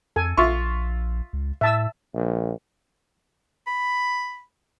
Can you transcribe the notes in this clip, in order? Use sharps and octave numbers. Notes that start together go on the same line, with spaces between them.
F2 A4 G#5
A#1 F4 E5 C#6
C#2
A2 E5 A5 E6
A#1
B5